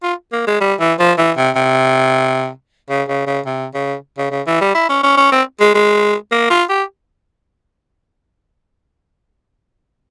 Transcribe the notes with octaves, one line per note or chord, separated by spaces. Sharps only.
F4
A#3
G#3
G3
E3
F3
E3
C3
C3
C#3
C#3
C#3
C3
C#3
C#3
C#3
E3
G3
E4
C#4
C#4
C#4
C4
G#3
G#3
A#3
F4
G4